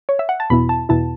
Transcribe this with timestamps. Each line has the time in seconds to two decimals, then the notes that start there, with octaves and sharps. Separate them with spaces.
0.09 C#5
0.19 E5
0.29 F#5
0.40 A5
0.50 E2 B2 B3 E4 B5
0.69 A5
0.89 E2 B2 B3 E4 A5